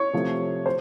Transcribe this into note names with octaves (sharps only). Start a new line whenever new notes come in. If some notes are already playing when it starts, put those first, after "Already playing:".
Already playing: C#5 C#6
C3 F3 A3
C5